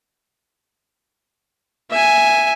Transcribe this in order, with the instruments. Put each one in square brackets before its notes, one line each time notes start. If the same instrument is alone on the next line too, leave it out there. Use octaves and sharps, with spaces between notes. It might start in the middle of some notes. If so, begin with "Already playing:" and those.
[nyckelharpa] E5 G#5